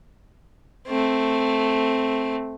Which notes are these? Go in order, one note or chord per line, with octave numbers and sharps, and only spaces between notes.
A3 C4